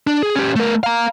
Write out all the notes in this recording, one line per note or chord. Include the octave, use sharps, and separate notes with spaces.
D4
G#4
C#4 G4
A3 A#4
F5 A#5